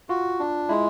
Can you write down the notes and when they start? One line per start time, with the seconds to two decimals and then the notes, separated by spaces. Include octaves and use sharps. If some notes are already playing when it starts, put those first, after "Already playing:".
0.09 F4 F#4
0.40 D4
0.69 G#3 E4